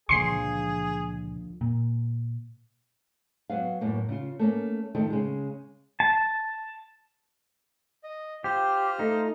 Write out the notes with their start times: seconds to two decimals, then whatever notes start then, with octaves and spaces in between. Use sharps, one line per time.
0.09 C#2 A#2 D3 F3 G#4 C6 C7
1.61 A#2
3.49 F#3 B3 F5
3.81 F#2 A2 A#3
4.09 C#3 F4
4.39 A3 A#3 C#4
4.95 D#3 F3 A3
5.10 C#3 G#3
6.00 A5
8.04 D#5
8.44 F4 G4 C5 F6
8.99 A3 D#4